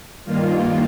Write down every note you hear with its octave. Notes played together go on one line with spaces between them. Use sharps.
G2 D#3 A#3 F4